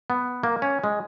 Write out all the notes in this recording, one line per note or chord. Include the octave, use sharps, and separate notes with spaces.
B3
A#3
C#4
G#3